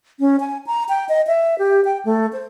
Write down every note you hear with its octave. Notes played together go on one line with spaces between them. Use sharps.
C#4
G#5
A#5
G5
D#5
E5
G4
G5
A3
C5